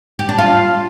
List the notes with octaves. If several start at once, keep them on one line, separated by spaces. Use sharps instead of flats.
G4
D4
F4